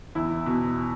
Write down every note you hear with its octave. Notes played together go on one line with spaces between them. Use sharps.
E2 E4
B2